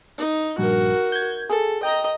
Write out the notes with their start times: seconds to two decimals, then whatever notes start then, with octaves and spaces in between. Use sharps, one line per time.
0.18 D#4
0.58 A#1 G2 F#4 A#4
1.12 G6 G#6
1.49 G#4 A4
1.83 D#5 G5 A#5